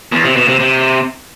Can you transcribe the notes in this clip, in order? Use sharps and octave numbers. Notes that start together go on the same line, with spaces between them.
E2
C3
B2
C3
C3